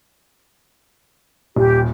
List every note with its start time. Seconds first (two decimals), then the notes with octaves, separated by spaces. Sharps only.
1.56 D#1 G4